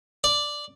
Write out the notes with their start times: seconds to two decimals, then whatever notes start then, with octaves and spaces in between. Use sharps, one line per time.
0.24 D5